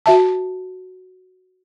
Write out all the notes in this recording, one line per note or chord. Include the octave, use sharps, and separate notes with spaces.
F#4 E5 A5